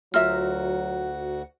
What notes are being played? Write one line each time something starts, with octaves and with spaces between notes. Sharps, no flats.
D2 F#3 F4 F#4 A#4 E5 F#5 F6